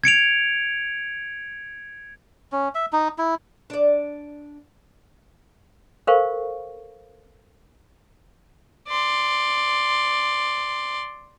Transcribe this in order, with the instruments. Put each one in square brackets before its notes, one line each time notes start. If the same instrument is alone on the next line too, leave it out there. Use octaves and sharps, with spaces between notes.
[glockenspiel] G#6 C#7 D7 F7
[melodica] C#4
E5
D#4
E4
[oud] D4 D5
[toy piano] A4 A#4 C5 F5 G5 C#6
[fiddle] D5 C6